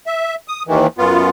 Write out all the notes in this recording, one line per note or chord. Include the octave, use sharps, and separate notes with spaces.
E5
D#6
D#2 D#3 E3
F#2 B3 F4